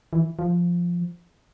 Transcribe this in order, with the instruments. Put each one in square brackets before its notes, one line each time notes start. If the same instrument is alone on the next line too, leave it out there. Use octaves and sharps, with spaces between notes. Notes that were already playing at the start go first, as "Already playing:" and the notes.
[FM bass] E3
F3